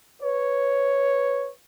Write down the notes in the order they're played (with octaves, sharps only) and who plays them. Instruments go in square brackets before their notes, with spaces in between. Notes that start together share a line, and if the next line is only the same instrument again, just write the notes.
[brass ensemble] B4 C#5